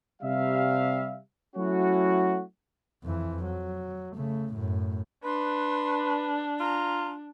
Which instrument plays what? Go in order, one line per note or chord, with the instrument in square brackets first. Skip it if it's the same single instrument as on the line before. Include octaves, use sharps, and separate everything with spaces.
[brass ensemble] C3 G3 E5 F5
F#3 A3 C#4 E4 F#4
[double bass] F2 E3
F#3
C#3 A3
F#2 A2
[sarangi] D4 [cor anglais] B4 [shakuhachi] C6
[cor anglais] F4 [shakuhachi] A#5